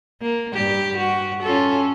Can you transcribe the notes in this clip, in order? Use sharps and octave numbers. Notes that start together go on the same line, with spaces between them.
A#3
G2 G3 G4
F#4
C#4 F4 A4